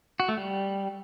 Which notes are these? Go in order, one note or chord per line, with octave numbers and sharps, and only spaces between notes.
F#4
A3
G3